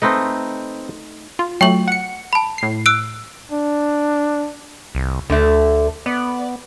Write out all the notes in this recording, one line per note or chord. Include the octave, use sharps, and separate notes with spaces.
A3 C4 D#4 B4 D#5
F4
F#3 A3 G5 C#6 F#7
F#5 C#7
A5 B5
A2 C7
E6 F#6 D7
D4
C2
D2 D3 A3
B3 D5